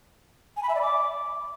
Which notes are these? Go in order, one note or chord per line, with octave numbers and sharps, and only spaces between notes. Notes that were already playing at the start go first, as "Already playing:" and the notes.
G#5
B5
E5
D5
D6